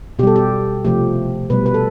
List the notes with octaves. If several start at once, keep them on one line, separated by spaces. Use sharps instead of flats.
B2 G3 G4 A4
G4
C3 F3 A3 G4
B2 G3 B4
B4
A4